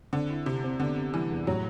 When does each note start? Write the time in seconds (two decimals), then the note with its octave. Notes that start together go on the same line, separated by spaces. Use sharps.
0.13 D3 C4
0.30 E4
0.46 C3 C4
0.64 C4
0.80 D3 B3
0.96 C3
1.14 E3 G3
1.31 E2
1.47 A2 F#3